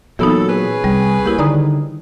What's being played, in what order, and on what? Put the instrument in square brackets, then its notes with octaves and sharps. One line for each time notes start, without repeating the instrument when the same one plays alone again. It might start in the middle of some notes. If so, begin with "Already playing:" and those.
[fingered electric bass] A#2 F#3 [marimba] E3 B3 D#4 [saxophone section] A4
[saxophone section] C#4 G#4 B4
[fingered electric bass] C2 [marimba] G3
[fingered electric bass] A#3 [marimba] E4 G4
[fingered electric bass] D3 D#3 [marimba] D5 A#5 D#6